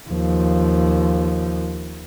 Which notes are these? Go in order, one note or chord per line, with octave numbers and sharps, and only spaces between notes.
D#2 F3